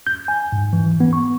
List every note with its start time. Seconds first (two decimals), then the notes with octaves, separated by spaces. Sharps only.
0.07 G6
0.28 G#5
0.52 G#2
0.73 E3
1.00 B3
1.13 C#6